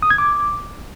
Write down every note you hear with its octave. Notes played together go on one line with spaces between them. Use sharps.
D#6
G#6
D6